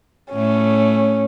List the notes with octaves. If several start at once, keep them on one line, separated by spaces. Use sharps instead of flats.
A2 A3 C#4